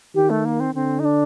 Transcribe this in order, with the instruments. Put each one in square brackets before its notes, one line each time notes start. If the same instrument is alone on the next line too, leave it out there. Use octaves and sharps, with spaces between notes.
[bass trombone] D#3 [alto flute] G4
[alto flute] A3
A#3
C4
[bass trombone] D3 [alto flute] C4
[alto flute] D#4
D4